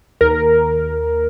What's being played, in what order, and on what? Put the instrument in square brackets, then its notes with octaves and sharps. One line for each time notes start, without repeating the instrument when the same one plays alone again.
[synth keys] D#2 A#4